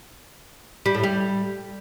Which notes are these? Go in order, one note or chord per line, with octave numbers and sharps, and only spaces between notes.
G3
A2
G3